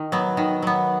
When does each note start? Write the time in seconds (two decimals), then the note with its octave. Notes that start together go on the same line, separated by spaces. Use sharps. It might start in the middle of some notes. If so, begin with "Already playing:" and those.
Already playing: D#3
0.12 F#3 B3
0.37 D#3
0.62 F#3 B3